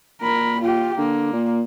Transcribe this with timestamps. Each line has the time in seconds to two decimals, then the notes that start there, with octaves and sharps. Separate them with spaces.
0.22 A#2 A#4 B5
0.61 F4 G4
0.98 D3 A#3
1.33 A#2